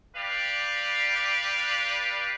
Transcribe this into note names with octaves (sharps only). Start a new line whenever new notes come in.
G4 B4 D5 F5